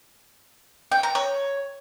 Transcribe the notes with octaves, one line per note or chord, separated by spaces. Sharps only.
G5
A#5
C#5